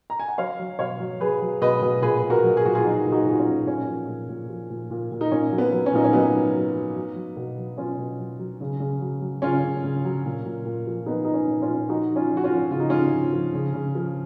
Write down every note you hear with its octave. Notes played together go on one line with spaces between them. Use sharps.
A#5
G#5
F#5
F#3 C#5 F5
F#3
B2 C#5 F5
F#3
F#3 G#4 B4
F#3
B2 B4 D#5
B2
A#2 G#4 B4
A#2
F#4 A#4
F#3
G#4
A#2 F#4
F4 G#4
F#3 D#4 F#4
A#2
D#4 F#4
A#2 F#4
C#4 F4
F#3
A#2 C#4
F3
A#2
A#2
F3
A#2
A#2
A#2
D#4
A#2 C#4
F#3
B3
F#3
C#4
A#2 D#4
C#4
F#3 B3 D#4
F#3
F#3
F#3
F#3
F#3
B2
F#3
B2 C#4 F4
B2
F#3
F#3
C#3
C#3
F#3
F#3
C#3 C#4 F4
C#3
C#3
F#3
A#2
A#2
A#2
F3
F3 B3 D#4
F3 D#4
C#4
A#2
C#4 F4
A#2
F3 D#4 F#4
F3
C#4 F4
F3
F#4
C#4 F4
F3
C#3 F4
D#4
C#3 C#4 F4
F3
F3
C#3
C#3
F3